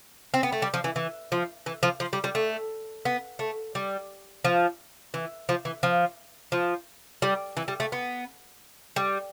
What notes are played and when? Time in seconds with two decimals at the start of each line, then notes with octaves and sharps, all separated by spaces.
0.34 C4
0.43 B3
0.52 A3
0.62 G3
0.74 F3
0.84 E3
0.96 E3
1.32 F3
1.66 E3
1.83 F3
2.00 F3
2.13 G3
2.24 G3
2.35 A3
3.05 B3
3.39 A3
3.75 G3
4.45 F3
5.14 E3
5.49 F3
5.65 E3
5.83 F3
6.52 F3
7.22 G3
7.57 E3
7.68 G3
7.80 A3
7.92 B3
8.96 G3